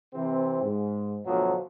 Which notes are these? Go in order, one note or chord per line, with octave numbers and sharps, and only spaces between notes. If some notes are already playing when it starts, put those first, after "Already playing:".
C3 E3 C4
G#2
D2 B2 F3 F#3